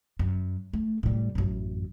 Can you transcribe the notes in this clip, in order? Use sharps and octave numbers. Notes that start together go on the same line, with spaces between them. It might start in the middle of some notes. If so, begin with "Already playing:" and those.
F#2
A3
A2 G3
A1 F#2